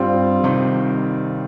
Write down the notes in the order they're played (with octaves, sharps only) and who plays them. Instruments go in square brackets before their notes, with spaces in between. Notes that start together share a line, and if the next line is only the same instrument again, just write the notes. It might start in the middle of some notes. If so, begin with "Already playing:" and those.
Already playing: [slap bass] G2 [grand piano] G3 C4 F4
[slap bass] C3 D#3